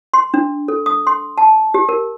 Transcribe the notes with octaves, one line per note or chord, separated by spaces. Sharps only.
C6
D4
A4
D#6
C6
A5
G4
A#4